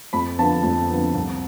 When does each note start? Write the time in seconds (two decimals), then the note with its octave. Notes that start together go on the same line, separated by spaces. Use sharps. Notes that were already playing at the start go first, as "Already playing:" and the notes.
0.13 F2 B5
0.38 D3 F3 B3 A5
0.63 F2
0.90 D3 F3 B3
1.14 C2